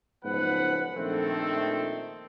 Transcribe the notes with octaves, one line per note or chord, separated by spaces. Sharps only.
F#1 G#2 F3 B3 B4 F#5
A#1 F2 D#3 A3 C4 A4